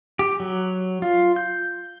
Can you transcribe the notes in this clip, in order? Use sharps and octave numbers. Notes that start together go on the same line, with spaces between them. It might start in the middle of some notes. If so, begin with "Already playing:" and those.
G4
F#3
F4
G6